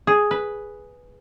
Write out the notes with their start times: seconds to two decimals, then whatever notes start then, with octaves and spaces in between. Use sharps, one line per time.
0.07 G#4
0.31 B4